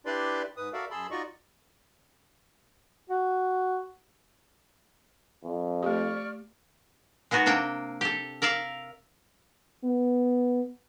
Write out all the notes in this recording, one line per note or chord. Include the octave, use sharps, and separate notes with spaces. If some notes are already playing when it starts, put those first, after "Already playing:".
D4 E4 G4 B4 D5 C6
G#2 B4 D#6
F#4 A4 A#4 D5 E5 F5
F#2 G#4 A5 B5 C6 E6
D#4 F4 F#4 D5 D#5 C#6
F#4
F2
A3 G4 D5 C#6 F6
G#3 B3 D#4 F#4
C3 A#3 D4 G5
G4 A4
A#4 D5 E5 F5
B3